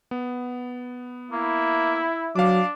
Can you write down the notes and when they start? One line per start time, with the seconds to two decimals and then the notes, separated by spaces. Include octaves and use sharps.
0.11 B3
1.31 A#3 E4
2.36 F#3 D4 F5 D6